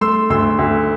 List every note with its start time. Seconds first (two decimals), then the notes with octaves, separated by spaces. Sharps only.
0.01 A3 C6 E6
0.30 D2 C6 E6
0.59 D2